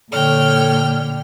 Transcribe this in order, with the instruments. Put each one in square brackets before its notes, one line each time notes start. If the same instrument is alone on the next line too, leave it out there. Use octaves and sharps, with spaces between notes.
[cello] A#2 D3 [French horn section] A4 C#5 [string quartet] G5 F6